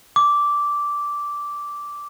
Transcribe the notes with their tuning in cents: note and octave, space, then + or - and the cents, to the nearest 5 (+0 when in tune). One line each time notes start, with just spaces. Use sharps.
D6 -10